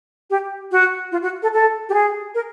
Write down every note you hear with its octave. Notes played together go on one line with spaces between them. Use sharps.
G4
F#4
F4
F#4
A4
A4
G4
G#4
A#4